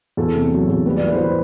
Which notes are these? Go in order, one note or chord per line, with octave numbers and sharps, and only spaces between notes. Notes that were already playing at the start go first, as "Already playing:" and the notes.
E2 A4
C3
F#3
E2
G3 B4
D5
E3
B4
C5
E3 B4